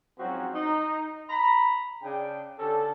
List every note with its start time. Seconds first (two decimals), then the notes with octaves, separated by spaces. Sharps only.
0.19 G#2 F3 F#3 C4 C#4 F#4
0.54 D#4
1.30 A#5 B5
2.03 C#3 D4 G5
2.59 D3 C#4 G4 A4